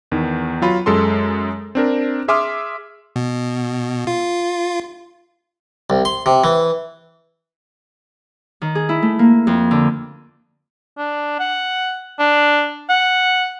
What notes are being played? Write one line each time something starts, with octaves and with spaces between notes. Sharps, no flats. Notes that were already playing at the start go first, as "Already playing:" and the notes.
E2 D#3
F#3 F4 B5
F#2 G#3 A4 C6
C4 D4 A#4
G#4 E5 C6 D6 D#6 F6
B2
F4
C2
C6
C3
E3
D#3
G#4
E4
A3
A#3
F2
D3
D4
F#5
D4
F#5